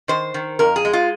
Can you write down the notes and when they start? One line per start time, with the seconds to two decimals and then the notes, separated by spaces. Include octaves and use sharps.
0.08 D#3 C5
0.34 D#3
0.59 F2 A#4
0.76 G#4
0.85 G#3
0.93 F4